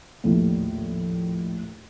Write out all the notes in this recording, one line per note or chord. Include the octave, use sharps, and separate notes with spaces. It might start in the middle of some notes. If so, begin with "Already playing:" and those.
A#1 D#2 A2